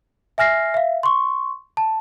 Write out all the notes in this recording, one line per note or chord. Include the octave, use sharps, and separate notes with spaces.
E5 G#5 F6 A#6 C7
E5 F5
C6 C#6
A5